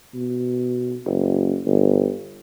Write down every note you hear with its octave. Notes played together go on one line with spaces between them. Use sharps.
B2
F#1
G1